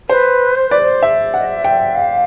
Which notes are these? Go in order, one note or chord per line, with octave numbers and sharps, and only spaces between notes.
B4 C5
C5
B4 D5
C5
E5
D#5 F#5
E5
G5
F5